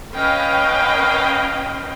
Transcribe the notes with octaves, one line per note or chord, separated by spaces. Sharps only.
C#4 B4 D#5 F5 G5